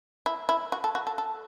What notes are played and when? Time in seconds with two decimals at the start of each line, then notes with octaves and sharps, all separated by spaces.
0.26 E4
0.49 E4
0.72 F#4
0.84 A4
0.95 F#4
1.07 A4
1.18 A4